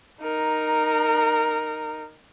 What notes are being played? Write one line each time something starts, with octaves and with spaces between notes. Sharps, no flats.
D#4 A#4